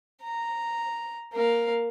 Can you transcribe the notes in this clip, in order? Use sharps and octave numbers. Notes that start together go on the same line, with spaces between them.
A#5
A#3 F5